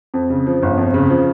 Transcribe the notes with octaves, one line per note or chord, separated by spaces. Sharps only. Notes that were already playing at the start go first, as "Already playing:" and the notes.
F2
C#3
F3
G1
F2
C#3
F3